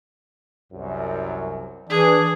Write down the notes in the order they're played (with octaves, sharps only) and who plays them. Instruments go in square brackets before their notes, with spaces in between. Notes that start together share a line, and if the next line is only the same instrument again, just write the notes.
[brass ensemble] C2 F#2
[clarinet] E3 [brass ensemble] D4 [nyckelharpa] G#4